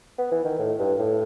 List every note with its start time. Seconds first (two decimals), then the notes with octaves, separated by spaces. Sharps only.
0.18 B3
0.32 E3
0.45 D#3
0.59 A2
0.79 G2
0.99 A2